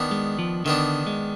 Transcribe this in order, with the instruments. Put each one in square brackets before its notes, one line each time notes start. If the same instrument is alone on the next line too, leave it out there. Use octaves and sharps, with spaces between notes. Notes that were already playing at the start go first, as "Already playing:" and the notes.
Already playing: [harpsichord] D#3 B3 D4
[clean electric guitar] G#3
F3
[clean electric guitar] D3 [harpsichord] D#3 B3 D4
[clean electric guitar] G#3